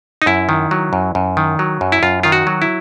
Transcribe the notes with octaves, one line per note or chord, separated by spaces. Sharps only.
D#4
F#2 E4
D#3
F#3
F#2
F#2
D#3
F#3
F#2
E4
F#2 F4
D#3 F4
F#4
F#3
E4